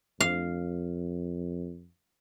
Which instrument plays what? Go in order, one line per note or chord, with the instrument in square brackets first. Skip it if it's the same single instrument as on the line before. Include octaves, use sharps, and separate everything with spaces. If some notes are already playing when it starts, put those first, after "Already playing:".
[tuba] F2 [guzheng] F5